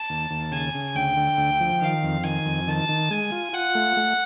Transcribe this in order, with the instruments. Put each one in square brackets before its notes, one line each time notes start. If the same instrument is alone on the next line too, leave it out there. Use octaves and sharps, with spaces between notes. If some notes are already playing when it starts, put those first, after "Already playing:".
Already playing: [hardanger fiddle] A5
[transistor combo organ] D#2
D#2
[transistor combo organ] C#3 [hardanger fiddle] G#5
[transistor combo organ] C#3
[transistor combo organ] D2 [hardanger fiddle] G5
[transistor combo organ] D3
D2
F3
[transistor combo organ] D#3 [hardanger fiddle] F5
[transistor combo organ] F2
[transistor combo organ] D#3 [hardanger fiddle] G#5
[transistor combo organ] F2
[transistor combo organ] D#3 [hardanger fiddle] A5
[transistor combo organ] D#3
[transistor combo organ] G#3 [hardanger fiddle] G#5
[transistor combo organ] F4
[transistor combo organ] F4 [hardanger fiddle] F#5
[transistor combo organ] A3
A3